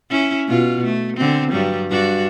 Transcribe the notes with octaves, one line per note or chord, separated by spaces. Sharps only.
C#4 E4
B2 F4
A3
D3 C4
G2 F#3 G3
G2 D4 F#4